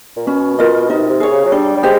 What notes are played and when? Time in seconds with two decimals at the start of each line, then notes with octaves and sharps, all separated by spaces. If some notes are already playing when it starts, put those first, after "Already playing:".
0.17 A#2
0.26 B2 C#4
0.59 F4 A#4 D#5
0.90 C3 D#4
1.10 C3
1.20 G#4 C#5
1.31 C#3
1.45 F#3
1.52 G3 D4
1.77 G3
1.83 G#3 G4 C5